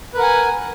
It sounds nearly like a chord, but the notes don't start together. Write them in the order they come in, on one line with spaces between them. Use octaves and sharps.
B4 A#4 F#5 G#5